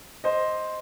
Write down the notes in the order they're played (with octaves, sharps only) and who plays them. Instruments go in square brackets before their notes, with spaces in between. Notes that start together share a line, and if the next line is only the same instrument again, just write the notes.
[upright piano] C5 D#5